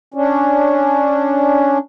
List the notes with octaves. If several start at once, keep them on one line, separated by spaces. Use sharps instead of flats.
C#4 D4